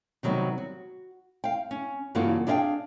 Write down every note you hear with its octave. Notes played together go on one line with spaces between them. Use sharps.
C3 D#3 F#3 G3 B3
F#4
F5 G5
C#4
G2 C#3 E3 A#3 F4 F#4
D4 G#4 A#4 D#5 F5 G5